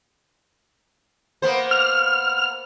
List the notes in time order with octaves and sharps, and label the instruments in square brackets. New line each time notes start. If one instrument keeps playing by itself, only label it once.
[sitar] A#3 B3 C5
[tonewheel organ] F6